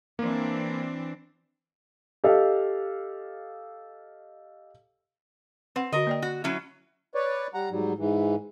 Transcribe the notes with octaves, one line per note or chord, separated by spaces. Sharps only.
E3 A#3 C4 D4
G4 A4 D#5 F5
C4 B4 F#5
D3 F#4 A#4 D#5
A#3 D5 G5
F#4
F#3 C#4 E4
B4 C#5 D5
G3 F#5 A#5
G#2 F#3 G3
G#2 E3